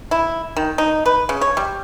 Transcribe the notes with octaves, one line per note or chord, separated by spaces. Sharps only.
E4
D#3
D#4
B4
C#3
C#5
G3